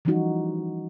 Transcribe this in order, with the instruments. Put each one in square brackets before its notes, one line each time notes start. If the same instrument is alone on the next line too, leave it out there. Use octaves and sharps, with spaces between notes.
[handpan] E3 F3 G3 C#4 D#4 F#4